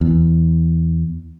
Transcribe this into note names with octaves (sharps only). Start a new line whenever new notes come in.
E2